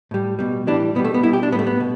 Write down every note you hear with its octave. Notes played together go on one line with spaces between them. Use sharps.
A2 G3
B2 G3
A2 E3 G3 D4
B2 G3 B3
A3
B3
B2 G3 E4
G4
D4
A2 G3 A3 B3
B3
B2